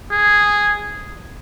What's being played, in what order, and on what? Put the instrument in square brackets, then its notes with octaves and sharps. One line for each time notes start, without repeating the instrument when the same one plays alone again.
[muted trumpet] G#4